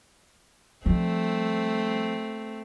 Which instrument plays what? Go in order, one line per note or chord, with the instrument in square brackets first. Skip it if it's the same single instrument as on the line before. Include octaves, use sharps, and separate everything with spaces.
[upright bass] F3 G3 [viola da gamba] A3 C4